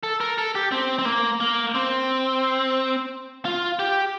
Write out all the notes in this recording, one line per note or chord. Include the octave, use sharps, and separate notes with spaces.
A4
A#4
A4
G4
C4
C4
A#3
A#3
C4
F4
G4